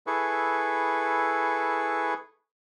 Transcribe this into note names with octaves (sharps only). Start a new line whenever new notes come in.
E4 G#4 A4 B4 C#6